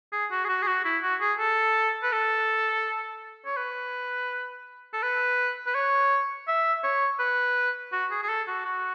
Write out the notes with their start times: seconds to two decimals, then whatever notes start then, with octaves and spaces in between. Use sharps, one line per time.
0.13 G#4
0.31 F#4
0.44 G#4
0.48 F#4
0.62 G#4
0.67 F#4
0.85 E4
1.03 F#4
1.21 G#4
1.39 A4
2.03 B4
2.12 A4
3.45 C#5
3.57 B4
4.94 A4
5.02 B4
5.66 B4
5.75 C#5
6.48 E5
6.83 C#5
7.19 B4
7.93 F#4
8.11 G#4
8.23 G#4
8.29 A4
8.48 F#4
8.65 F#4